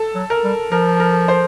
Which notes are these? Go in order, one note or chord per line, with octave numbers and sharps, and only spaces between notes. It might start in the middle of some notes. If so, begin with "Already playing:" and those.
Already playing: A4
F#3
A#4
G3
F3 A#4
A#4
C5